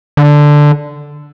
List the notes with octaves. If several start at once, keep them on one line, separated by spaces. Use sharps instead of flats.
D3